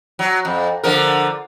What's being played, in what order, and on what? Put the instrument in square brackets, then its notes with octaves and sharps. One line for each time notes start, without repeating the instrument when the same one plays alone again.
[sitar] F#3
F2
D3 F3 A#4